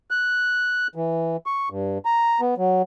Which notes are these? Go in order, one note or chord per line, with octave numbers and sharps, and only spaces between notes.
F#6
E3
C#6
G2
A#5
B3
F#3